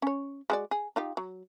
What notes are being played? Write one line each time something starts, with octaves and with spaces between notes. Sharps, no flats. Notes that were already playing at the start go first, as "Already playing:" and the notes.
C#4 C#5
G#3 F#4 D5
G#4
D#4 F4 G4
F#3